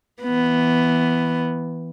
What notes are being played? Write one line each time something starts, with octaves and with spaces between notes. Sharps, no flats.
E3 B3